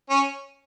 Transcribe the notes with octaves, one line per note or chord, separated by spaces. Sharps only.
C#4